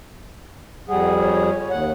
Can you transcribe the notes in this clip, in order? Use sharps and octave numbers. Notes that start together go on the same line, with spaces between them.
F2 G3 G#4 F#5
C#5
D#2 F#5